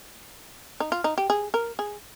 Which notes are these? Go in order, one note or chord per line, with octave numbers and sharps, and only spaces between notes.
D#4
F4
D#4
G4
G#4
A#4
G#4